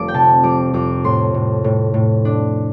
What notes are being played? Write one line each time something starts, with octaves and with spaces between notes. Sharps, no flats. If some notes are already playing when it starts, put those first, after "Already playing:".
Already playing: F1 F3 D6
G5
C3 A5
F2 D6
F2 D6
A2 C6
A2
A2
A2
D4